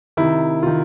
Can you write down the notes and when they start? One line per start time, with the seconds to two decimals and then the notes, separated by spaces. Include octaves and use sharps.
0.17 C3 D#3 E4
0.63 C3 D#3 F4